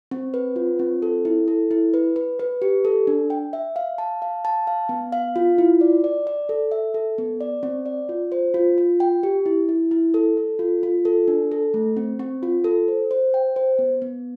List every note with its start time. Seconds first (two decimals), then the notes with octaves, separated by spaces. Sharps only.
0.11 C4
0.34 B4
0.56 F4
0.79 C4
1.02 A4
1.25 E4
1.48 A4
1.71 E4
1.94 B4
2.16 B4
2.39 B4
2.62 G4
2.85 A4
3.07 D4
3.30 G5
3.53 E5
3.76 F5
3.98 A5
4.22 F5
4.45 A5
4.67 F5
4.89 B3
5.12 F5
5.36 F4
5.58 E4
5.81 D5
6.04 D5
6.27 D5
6.49 A4
6.71 E5
6.94 A4
7.18 B3
7.41 D5
7.63 C4
7.86 D5
8.09 F4
8.32 C5
8.54 F4
8.78 F4
9.00 G5
9.23 G4
9.46 E4
9.69 E4
9.91 E4
10.14 A4
10.37 A4
10.59 F4
10.83 F4
11.05 A4
11.28 D4
11.52 A4
11.74 A3
11.97 C4
12.19 C4
12.43 F4
12.64 A4
12.88 C5
13.11 C5
13.34 G5
13.56 C5
13.79 B3
14.02 B3